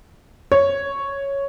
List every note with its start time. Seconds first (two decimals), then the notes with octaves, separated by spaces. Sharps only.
0.52 C#5